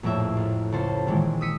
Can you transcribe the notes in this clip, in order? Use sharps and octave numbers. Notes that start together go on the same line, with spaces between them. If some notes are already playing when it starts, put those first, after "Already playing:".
A#1 F2 A2 E4 E5
A1
C#2 A4 C5
A#1 D#3 E3 G#3
D#6 E6 B6 C#7 D#7